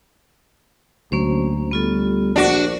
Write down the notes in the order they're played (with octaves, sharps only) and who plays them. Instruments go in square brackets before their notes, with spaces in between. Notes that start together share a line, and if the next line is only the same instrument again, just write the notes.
[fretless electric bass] D2 [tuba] F#3 [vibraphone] A#3 C#4 C5
[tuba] G3 [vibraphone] B3 F4 A4
[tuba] A#1 [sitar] D4 F#4